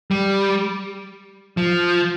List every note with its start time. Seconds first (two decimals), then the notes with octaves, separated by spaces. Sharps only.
0.11 G3
1.57 F3